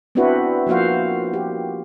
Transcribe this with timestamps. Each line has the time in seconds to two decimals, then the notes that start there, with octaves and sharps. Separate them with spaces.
0.15 B3 C4 D4 E4 F#4 B4
0.67 F3 A#3 F#4 C5 F5
1.34 G4